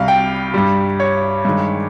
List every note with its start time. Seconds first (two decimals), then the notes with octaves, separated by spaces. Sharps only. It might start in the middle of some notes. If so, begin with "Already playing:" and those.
Already playing: C2 C3 G3 F5
0.08 G5
0.54 G2 G3
1.00 C#5
1.45 G2 D#3 G#3